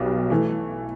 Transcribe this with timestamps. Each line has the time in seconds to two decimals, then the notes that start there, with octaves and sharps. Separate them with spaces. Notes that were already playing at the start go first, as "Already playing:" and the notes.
Already playing: B1 B2 G3
0.30 E3 A3